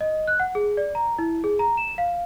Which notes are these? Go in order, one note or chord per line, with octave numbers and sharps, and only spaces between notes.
D#5
F#6
F#5
G#4
D5
A#5
E4
G#4
A#5
E7
F5